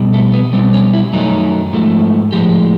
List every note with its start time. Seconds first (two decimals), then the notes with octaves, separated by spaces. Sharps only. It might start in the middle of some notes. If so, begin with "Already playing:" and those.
Already playing: B2 G3
0.13 A3
0.33 B3
0.53 B2 G3 C4
0.73 C#4
0.93 E4
1.13 F#2 D#3 F#3 A3 D#4
1.73 G#2 F3 A3
2.32 A2 F3 G#3 G4